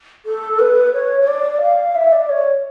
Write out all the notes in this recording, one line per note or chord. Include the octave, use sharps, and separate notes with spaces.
A4
B4
C#5
C#5
D5
F5
E5
D5
C#5